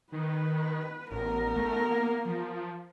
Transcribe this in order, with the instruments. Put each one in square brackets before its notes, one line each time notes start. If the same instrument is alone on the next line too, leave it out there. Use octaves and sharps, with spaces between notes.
[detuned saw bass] D#3 [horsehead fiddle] B4
[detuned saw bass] A1 [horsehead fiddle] B3 A#4
[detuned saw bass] A3
A#3
F3